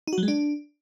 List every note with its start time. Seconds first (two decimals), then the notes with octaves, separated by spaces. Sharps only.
0.07 D#4
0.13 F#4
0.18 F#3
0.23 G#3
0.28 D4